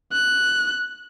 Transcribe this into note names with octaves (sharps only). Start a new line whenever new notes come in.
F#6